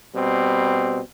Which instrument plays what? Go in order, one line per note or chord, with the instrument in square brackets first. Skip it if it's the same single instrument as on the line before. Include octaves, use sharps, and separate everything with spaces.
[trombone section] B2 G3 C4